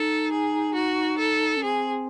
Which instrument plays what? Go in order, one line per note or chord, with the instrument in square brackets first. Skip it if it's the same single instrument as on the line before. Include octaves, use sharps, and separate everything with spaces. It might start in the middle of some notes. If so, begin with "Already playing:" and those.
Already playing: [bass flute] D#4 [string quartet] A4
[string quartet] G#4
F#4
A4
[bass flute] C#4
[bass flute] C4 [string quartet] G#4